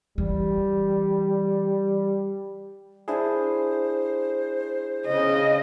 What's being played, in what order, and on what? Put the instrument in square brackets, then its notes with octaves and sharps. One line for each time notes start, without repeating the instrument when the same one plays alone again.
[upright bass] E3 [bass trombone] G3
[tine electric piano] D4 E4 G#4 [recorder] C5
[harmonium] C#3 [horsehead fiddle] D#5